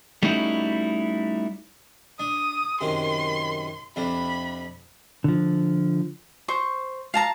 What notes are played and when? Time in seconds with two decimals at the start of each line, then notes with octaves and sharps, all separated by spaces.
0.23 G3 A3 C#4 D#4 E4 F#4
2.19 D4 D#6
2.81 F#2 C3 D#3 C6
3.96 F2 C3 D4 B5
5.24 D3 F3
6.48 C5 C#6
7.14 F5 A5 A#5